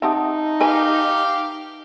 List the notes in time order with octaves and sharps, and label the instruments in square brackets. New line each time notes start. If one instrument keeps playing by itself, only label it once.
[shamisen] C4 G4 F#5 [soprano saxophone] D#4 [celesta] E5 A5 D#6
[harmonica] G4 F5 [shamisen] A#4 B4 G#5